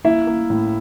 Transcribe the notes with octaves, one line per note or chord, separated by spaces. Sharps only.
A#3 E4 E5
A#3
A2